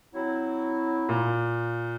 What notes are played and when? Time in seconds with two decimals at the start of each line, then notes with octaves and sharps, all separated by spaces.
0.14 F#3 C4 E4
1.09 A#2